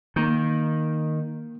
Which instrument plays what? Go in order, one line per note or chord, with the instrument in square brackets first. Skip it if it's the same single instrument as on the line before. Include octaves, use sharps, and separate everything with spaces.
[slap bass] D#3 [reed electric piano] A#3 G6